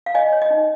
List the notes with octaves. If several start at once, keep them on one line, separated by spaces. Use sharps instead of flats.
F5
C#5 D#5 G#5
C#5
D#5
D#4